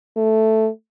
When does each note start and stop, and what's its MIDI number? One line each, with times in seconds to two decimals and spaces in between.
0.16 0.69 57